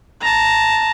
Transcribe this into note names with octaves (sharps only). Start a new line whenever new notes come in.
A5 A#5